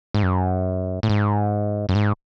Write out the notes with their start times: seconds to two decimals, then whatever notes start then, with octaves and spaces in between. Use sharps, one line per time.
0.14 G#2
0.23 F#2
1.03 A2
1.10 G#2
1.89 F#2
1.95 G#2